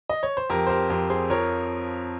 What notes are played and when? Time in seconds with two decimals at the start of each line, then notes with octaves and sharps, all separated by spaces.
0.09 D#5
0.23 C#5
0.37 C5
0.50 F2 G4 A#4
0.67 C5
0.69 G4 A#4
0.90 F2 G4 A#4
1.10 G#4 C5
1.30 F3 A#4 C#5